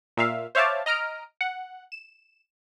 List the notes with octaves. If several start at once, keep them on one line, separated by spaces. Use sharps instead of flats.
A#2 E5 F5
C5 C#5 E5 F5 A5 D6
D#5 A#5 F6 D7
F#5
E7